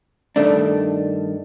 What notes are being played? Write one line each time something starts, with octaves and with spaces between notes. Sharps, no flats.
G2 D#3 A3 D4